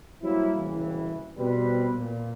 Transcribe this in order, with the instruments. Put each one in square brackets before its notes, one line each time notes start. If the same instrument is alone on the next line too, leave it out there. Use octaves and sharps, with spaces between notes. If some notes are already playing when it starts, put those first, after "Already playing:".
[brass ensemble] F#3 G3 A#3 C4 E4
F#1 C2 A2 C#3 E3
B2 G3 C4 B4
A#2